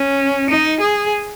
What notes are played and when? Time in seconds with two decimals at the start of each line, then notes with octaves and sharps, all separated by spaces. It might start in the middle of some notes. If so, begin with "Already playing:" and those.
Already playing: C#4
0.50 D#4
0.81 G#4